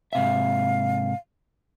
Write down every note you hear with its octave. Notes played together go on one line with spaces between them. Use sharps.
G#2 C3 E5 F5